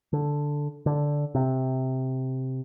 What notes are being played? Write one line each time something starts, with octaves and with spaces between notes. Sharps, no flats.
D3
D3
C3